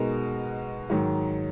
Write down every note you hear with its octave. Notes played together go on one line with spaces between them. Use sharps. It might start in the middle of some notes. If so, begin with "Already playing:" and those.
Already playing: B2 G#3 D#4 F#4 A#4
G#2 D#3 F#3